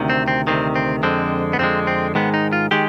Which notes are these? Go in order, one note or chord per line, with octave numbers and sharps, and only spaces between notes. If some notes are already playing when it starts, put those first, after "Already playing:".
Already playing: D2 C3 D#3
C4
C4
D2 C3 D#3 C4
C4
F2 D3 G#3 C4
B3
F2 D3 G#3 C4
C4
G#2 D#3 G#3 B3
D#4
F4
D#3 G#3 G4